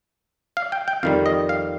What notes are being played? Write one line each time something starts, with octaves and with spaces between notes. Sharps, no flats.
F5
G5
G5
F2 D#3 G3 F5
D#5
F5